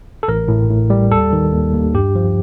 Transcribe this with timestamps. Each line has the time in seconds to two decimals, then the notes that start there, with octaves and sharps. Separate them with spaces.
0.23 A4
0.28 A1 A#4
0.48 A2
0.70 A2
0.90 G3
1.11 D#2 A4
1.33 D#3
1.53 D#2
1.74 D#2
1.94 G2 G4
2.15 F3